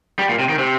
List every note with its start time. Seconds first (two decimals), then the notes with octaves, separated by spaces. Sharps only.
0.19 G3
0.29 A#2
0.39 C3
0.49 D#3
0.59 C3